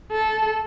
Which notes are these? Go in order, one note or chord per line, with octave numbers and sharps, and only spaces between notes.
A4